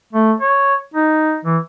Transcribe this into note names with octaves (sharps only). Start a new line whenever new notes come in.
A3
C#5
D#4
E3